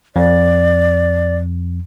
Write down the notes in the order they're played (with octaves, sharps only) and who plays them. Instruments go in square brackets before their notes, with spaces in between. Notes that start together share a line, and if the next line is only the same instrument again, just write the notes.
[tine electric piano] F2 [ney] D5